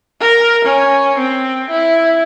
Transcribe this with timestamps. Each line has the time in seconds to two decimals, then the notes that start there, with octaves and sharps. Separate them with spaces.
0.21 A#4
0.65 C#4
1.18 C4
1.70 E4